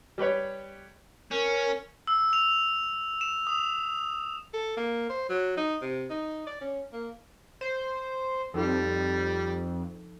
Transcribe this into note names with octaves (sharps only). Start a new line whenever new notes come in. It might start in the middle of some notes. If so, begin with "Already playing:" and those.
G3 G4 B4 C#5
C#4 A#4
E6
F7
E7
D#6
A4
A#3
C5
F#3
D#4
C3
D#4
D5
C#4
A#3
C5
F2 F3 G3 D#4 A4